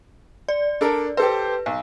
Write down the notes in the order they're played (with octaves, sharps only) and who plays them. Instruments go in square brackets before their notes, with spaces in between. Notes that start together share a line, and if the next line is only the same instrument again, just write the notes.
[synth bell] D5
[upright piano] D4 A4 A#4
[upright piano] G4 A4 C5 [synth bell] B4
[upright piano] B1